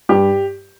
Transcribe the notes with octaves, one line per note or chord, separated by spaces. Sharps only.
G2 G4